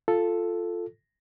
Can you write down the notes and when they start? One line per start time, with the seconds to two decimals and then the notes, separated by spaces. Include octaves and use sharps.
0.08 F4 A4